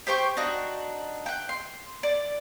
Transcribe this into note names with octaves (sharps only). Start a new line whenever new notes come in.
G4 C5 G5 C#6
D4 D#4 F#4 F#5
G5 F#6
C6
D5